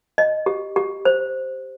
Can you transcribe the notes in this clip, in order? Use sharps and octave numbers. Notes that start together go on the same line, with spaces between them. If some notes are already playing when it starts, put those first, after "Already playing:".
D#5
G4
G4
C5